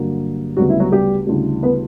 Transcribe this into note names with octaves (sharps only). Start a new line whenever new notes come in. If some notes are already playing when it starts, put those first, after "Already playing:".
Already playing: G2 D3 F#3 A#3
D2 C#3 F#3 G3 B3 F#4
E4
F#3 F#4
G3 G4
D2 C#3 E3 G3
B3 B4